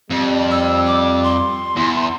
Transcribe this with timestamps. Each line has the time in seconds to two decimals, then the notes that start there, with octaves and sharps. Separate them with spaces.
0.10 F2 G3
0.51 E6
0.87 D6
1.24 C6
1.76 E2